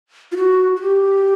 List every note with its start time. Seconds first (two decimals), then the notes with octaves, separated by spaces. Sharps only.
0.32 F4
0.37 F#4
0.76 F#4
0.81 G4